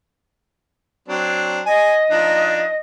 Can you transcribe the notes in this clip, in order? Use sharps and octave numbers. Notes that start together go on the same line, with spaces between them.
F#3 C4 D4
D#5 G#5
F3 D4 D#4